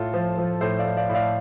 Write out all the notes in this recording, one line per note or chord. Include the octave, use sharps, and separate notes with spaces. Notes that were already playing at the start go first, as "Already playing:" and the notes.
Already playing: A2 F4 A4
F3
F3
A2 A4 C5
D5 F5
A2
D5 F5
A2
D5 F5